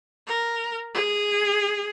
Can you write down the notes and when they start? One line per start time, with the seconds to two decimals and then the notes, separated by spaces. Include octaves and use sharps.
0.27 A#4
0.94 G#4